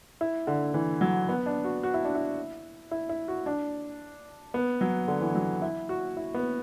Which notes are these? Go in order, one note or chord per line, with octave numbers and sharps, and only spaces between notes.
E4
D3
E3
F#3
B3
D4
F#4
F#4
E4
D4
E4
E4
E4
F#4
D4
B3
F#3
D3
E3
F#3
E4
F#4
E4
B3